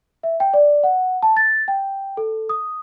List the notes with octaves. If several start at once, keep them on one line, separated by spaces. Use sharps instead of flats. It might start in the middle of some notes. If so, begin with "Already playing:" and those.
E5
G5
D5
F#5
A5
A6
G5
A4
D#6